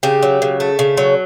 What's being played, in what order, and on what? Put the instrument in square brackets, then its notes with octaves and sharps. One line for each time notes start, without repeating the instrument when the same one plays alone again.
[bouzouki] C#3 G4
F#3
C#3
A3
C#3
F#3